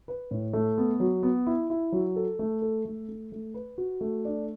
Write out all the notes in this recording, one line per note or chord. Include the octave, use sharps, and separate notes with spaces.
B4
A2
A3
B3
F#3
B3
E4
E4
F#3
A4
A3
A4
A3
A3
A3
B4
F#4
A3
D4